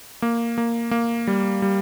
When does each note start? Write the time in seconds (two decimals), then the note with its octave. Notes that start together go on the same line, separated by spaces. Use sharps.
0.22 A#3
0.58 A#3
0.91 A#3
1.27 G3
1.62 G3